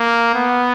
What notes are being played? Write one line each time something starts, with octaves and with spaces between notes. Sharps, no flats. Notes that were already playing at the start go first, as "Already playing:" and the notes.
Already playing: A#3
B3